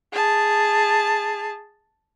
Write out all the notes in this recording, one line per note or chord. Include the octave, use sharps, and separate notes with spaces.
G#4 A5